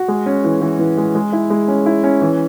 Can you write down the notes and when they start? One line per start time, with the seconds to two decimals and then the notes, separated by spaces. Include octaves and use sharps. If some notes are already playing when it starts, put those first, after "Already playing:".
Already playing: F#4
0.08 G#3
0.26 C#4
0.44 E3
0.61 E3
0.79 E3
0.97 G#3
1.15 G#3
1.32 E4
1.50 G#3
1.68 C#4
1.86 E4
2.04 C#4
2.21 E3